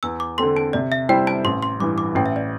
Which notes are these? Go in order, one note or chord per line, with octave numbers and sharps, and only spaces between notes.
E2 E6
D6
D3 C4 A4 C6
A5
C3 D5
E5
G3 E4 C5 G5
A5
A1 C6
C6
G2 E3 D6
D6
A1 G5
E5
D5